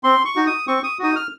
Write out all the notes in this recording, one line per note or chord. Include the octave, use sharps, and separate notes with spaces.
C4 C6
C#6
D#4 F#4
D#6
C4 C#6
D#6
D#4 F#4 D#6
F6